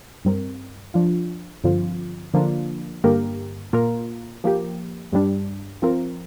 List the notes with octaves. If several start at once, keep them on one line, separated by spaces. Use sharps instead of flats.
G2 G3 C4 A#4
F3 D4 F4
G2 D3 F3 C4 F4
D3 F3 A#3 D4 F4
G2 D3 A#3 G4 A#4
A#2 A#3 F4 A#4
F3 A#3 G4
G2 G3 D4
F3 C4 F4 A#4